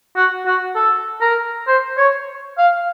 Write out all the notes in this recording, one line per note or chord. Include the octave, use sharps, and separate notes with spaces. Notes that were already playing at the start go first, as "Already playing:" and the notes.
F#4
F#4
A4
A#4
C5
C#5
F5